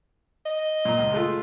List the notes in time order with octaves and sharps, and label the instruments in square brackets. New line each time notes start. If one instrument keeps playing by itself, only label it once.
[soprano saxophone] D#5
[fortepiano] A#2 A#5
C#2
G#3 A3 F4